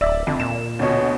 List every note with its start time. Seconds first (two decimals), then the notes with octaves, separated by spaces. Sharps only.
0.01 D1 D5 E5
0.27 F2 D3
0.40 A#2 E7
0.79 D2 B2 C#5